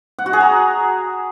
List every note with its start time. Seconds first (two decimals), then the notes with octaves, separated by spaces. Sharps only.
0.19 F#5
0.26 F#4
0.33 G#4
0.41 A#5